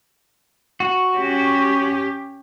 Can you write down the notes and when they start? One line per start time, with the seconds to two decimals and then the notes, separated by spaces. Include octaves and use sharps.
0.80 F#4
1.18 C#4 G4